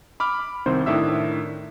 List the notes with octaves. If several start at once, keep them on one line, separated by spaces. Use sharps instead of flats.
B5 D6 F6
C2 D#3 C4 C5
A2 D#3 D4 E5 E6